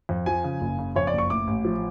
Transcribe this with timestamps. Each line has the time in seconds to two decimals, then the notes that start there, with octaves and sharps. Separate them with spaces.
0.09 F2
0.26 F3 G#5
0.44 C#3
0.61 F#1
0.79 C#3
0.96 F2 C#5
1.07 D5
1.13 F#1
1.18 C#6
1.30 A2 D6
1.47 A1
1.65 F3